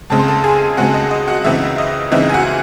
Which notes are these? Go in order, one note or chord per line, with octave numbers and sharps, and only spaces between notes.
C#2 C#3 G#3 C4 A5
C6
A4 A5
G#4 G#5
C#2 C#3 G#3 C4 F#4 F#5
D#5
D#5
F#4 F#5
C#2 C#3 E3 C4 D#4 E5
D#5
C#2 C#3 E3 C4 D#4 E5
G#5
F#4 F#5